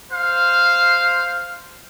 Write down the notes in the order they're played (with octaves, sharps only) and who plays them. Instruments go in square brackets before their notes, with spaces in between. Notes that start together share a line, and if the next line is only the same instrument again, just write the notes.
[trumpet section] C5 F5